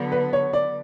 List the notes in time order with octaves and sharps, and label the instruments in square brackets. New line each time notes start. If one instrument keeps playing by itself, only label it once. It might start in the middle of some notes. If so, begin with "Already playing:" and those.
Already playing: [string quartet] D3 F#3 B3
[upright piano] B4
C#5
D5